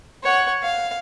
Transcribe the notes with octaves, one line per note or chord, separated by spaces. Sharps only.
C#5 F#5
F5